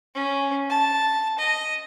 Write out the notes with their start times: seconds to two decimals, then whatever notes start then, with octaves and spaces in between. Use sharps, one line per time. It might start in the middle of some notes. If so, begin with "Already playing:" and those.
0.15 C#4
0.70 A5
1.39 D#5